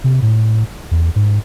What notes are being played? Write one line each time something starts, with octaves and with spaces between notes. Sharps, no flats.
C3
A2
E2
G#2